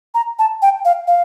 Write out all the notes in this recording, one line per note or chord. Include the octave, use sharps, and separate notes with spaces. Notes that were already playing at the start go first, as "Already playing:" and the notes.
A#5
A5
G5
F5
F5